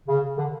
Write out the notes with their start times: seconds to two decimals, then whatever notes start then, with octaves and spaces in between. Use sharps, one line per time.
0.08 C#3
0.38 D3